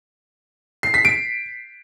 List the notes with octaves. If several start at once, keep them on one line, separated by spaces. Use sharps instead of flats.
C7
B6
D7